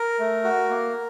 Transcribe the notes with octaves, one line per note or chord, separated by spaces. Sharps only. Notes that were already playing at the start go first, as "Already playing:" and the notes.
Already playing: A#4
A3
F#4
A#3